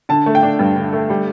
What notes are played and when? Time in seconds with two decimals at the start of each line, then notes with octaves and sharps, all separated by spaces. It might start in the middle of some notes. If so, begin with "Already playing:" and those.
0.09 D3 A5
0.26 A3
0.35 G5
0.43 D4
0.59 G2
0.76 D3
0.93 A3
1.10 G3